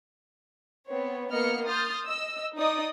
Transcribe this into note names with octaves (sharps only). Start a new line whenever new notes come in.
B3 C4 C#5
A#3 B3 A#4 D#5 F6 C#7
C6 D#6 F6 G6 A6
D#5 E6
D#4 D5 D#5 D#6